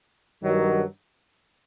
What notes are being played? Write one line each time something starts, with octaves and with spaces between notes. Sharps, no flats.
G2 D#3 F#3